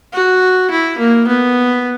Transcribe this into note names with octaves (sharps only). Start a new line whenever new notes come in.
F#4
E4
A#3
B3